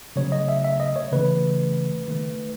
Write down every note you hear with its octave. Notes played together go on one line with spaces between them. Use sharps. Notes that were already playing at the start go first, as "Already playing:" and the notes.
C#3 F#3 A3 C#5
D#5
E5
E5
D#5
C#5
C#3 E3 A3 B4
D#3 A3